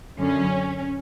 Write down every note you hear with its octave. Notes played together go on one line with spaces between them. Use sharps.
F#2 D3 C#4